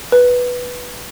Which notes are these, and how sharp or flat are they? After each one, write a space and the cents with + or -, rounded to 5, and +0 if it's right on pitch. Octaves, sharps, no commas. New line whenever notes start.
B4 -5